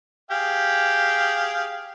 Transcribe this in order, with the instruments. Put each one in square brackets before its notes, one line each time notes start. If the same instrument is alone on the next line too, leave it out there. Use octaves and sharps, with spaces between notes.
[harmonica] G4 G#4 F5